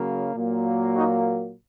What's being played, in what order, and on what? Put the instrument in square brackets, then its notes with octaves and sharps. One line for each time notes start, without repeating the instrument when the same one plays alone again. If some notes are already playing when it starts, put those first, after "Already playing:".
Already playing: [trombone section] C#3 F#3 A#3
A#2 F#3 A#3
D#4 F#4